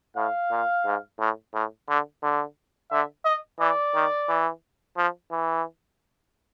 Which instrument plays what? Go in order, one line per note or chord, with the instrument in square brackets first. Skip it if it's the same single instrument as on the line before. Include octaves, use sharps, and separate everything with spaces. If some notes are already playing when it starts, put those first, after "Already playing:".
[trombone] A2 [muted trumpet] F5
[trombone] A#2
G#2
A2
A2
D3
D3
[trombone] D3 [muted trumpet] E5
[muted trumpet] D#5
[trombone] E3 [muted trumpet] D5
[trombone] D#3
E3
F3
E3